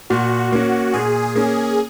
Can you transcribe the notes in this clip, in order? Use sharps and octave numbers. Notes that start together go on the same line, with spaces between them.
A#2 F#4
A#3 C#4 F#4
A#2 G#4
A#3 C#4 G#4